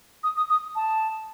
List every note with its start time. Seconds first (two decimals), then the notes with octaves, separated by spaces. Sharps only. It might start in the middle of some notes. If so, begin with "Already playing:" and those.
0.24 D#6
0.37 D#6
0.49 D#6
0.76 A5